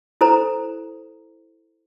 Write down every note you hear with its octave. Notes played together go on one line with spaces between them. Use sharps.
E4 A4 C5 A#5